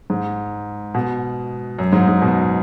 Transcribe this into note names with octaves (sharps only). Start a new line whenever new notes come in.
G#2
B2
F#2
G#2
G#2
B2